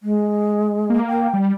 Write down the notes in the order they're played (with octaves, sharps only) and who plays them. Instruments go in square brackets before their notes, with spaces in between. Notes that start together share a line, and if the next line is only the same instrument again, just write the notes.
[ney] G#3
[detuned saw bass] A#3
[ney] G5
[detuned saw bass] G3